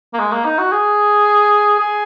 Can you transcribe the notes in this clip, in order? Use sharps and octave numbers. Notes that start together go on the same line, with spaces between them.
A#3
G#3
A#3
D#4
F#4
G#4
G#4